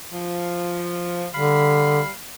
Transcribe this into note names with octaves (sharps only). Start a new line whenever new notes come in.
F3
D3 G3 F5 B5